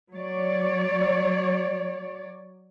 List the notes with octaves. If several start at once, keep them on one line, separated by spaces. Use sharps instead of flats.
F#3 C#5 D5